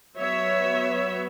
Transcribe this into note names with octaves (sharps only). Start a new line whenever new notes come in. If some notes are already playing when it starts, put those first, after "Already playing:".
F#3 B3 C#5 E5